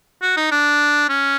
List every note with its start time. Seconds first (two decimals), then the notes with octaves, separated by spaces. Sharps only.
0.22 F#4
0.37 D#4
0.51 D4
1.09 C#4